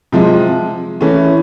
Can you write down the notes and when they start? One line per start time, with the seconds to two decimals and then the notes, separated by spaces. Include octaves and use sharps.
0.12 C3 F3 G#3
1.01 E3 A3 C#4